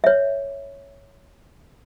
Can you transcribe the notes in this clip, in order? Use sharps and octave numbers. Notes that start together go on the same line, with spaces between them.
C#5 E5